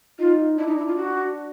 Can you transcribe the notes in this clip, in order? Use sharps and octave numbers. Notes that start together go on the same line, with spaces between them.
D#4 F4
D4 E4
D#4
E4
F4
F#4